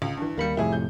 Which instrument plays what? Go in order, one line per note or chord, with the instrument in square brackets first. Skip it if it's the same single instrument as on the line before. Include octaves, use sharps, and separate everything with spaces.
[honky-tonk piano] C#2
G2 E3
[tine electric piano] D#2 B5 C#7 [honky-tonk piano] G3 A#3
[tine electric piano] F2 A2 C3 [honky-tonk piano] E4 G#4
[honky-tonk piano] G6